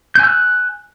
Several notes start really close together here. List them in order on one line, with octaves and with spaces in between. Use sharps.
G6 G#5 E6 F#6